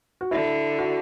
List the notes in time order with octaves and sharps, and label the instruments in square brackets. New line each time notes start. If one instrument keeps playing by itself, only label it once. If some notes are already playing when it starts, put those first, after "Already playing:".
[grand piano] F#4
[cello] D3 [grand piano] E4
[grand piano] F#4